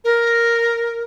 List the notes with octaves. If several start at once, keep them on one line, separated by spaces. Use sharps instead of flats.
A#4